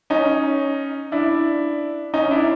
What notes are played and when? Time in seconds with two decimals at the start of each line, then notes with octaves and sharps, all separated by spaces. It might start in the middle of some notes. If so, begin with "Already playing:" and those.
0.10 C#4 D#4
1.12 D4 E4
2.14 C#4 D#4
2.31 D4 E4